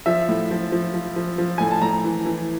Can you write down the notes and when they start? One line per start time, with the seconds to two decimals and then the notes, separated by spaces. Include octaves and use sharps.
0.06 F3 E5
0.29 A2
0.51 F3
0.72 F3
0.94 F3
1.16 F3
1.38 F3
1.58 A2 G#5
1.71 A5
1.82 A2 A#5
2.04 E3
2.26 E3